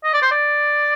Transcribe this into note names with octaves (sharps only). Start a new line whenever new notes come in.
D#5
D5
C5
D5